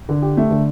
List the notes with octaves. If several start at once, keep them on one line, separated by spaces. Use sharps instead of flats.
D3
G4
A3
D3